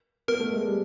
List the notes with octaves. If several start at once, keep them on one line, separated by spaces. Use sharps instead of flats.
B3 A#4
A3
G#3
G3